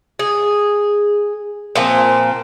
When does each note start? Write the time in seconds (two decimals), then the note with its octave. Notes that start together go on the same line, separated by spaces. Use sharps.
0.19 G#4
1.76 A#2 F3 C4